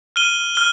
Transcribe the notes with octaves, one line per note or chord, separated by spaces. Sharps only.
F6 D#7 G7
F6 D#7 G7